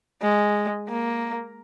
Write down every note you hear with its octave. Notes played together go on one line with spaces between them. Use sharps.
G#3
A#3